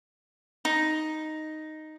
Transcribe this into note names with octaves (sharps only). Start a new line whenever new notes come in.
D#4